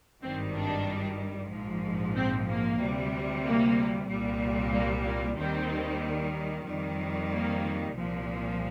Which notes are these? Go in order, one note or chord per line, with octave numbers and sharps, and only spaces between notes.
G#1 G2 D#3 G3 C4
D4
A#1 G#2 F3
C4
A#3
D2 C3 G3
A#3
C2 A#2 G3
A#3
A#3
D#2 D#3 G3 C4
F2 D#3 G3
A#3
C2 A#2 F3